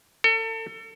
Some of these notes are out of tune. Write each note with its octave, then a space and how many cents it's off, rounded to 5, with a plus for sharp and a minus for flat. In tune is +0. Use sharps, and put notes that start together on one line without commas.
A4 +35